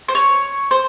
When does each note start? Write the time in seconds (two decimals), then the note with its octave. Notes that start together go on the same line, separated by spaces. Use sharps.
0.08 C5
0.15 C#5
0.71 C5